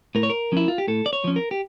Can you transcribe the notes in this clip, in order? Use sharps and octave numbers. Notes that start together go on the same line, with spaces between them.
A2 A#4
C#5
A#4
F3 C#4 E4
F4
G4
A2 A4
D5
C#5
F3 C#4
A#4
G4